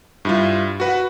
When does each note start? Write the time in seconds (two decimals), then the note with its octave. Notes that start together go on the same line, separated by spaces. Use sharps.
0.25 G2 E4 F4
0.80 F#4 B4 F#5